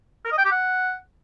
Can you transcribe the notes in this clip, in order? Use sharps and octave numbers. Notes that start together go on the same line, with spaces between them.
A#4
D#5
G5
G4
F#5